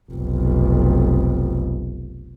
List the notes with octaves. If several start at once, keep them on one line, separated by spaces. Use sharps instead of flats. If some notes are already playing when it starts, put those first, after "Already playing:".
F1 B1